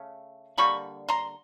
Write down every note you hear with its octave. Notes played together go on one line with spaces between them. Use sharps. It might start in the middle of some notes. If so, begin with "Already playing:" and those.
Already playing: C#3 A3
D3 G3 A#3 B5 C#6
A#5 C6